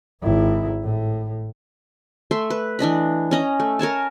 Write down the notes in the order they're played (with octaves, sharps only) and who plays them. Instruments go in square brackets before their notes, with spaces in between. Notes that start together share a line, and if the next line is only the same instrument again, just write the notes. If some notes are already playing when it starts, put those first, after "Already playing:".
[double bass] G#1 E4
A2
[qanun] A3 E5 C6
B4
E3 D4 D#5 B5
C#4 D#5 A#5
A3
A#4 C#5 G#5 A5